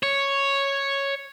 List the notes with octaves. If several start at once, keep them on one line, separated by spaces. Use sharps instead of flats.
C#5